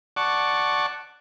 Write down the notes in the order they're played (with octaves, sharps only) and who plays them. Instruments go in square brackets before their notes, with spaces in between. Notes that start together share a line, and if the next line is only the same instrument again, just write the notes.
[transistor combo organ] D5 F#5 A5 C#6